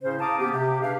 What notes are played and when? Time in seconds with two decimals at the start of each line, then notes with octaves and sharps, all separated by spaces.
0.03 A2 C#3 C#4 C5
0.20 F5 A5 A#5 D6 D#6
0.40 A#3 B3 C#4 G4
0.53 C3 G4
0.82 D4 G#4 B4 F5